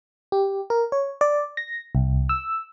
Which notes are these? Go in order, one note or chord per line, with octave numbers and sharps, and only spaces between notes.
G4
A#4
C#5
D5
A#6
C2
E6